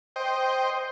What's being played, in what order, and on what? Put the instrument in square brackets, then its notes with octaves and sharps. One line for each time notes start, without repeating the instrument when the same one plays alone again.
[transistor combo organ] C5 D#5 G5